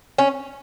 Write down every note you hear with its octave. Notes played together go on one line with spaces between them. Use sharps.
C#4